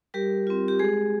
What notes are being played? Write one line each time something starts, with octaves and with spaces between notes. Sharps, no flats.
G3 G4 A#4
C4 F4
G4
G#3 G#4